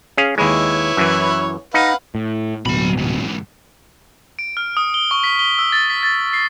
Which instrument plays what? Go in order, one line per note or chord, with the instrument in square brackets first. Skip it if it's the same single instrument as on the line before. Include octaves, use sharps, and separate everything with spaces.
[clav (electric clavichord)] C#4 G#4 F5
[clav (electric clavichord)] D#2 G#3 [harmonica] E4 B4 C#5
[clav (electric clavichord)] F#2 E3
[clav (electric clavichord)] D#4 [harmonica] B4 F5 F#5
[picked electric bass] A2
[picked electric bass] D1 G1 B2 [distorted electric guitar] F#3 B5
[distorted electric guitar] G#2 E3
[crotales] D7
F6
D#6
G7
C#6
B6
G7
E6
A6
B6
A6
C7